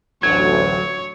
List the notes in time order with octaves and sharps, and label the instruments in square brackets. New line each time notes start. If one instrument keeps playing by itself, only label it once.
[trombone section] A1 D2 [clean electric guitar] F#3 [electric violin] C#5 [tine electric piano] G#6